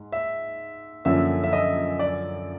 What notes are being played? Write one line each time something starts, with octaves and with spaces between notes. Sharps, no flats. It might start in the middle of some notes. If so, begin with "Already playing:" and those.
Already playing: G#2
E5
F#2 D3 F3 A#3 C#4 E5
E5
D#5
D5